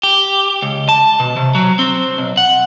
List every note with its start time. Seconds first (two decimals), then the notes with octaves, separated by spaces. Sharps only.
0.03 G4
0.62 C#2
0.89 A5
1.20 B2
1.37 C3
1.55 F#3
1.79 C4
2.18 B1
2.37 F#5